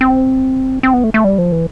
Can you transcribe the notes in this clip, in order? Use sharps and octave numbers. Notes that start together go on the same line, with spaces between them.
C4
C4
B3
A3
A3
G3
F3
E3